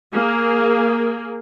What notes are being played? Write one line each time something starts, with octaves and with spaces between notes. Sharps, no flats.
A#3 G#4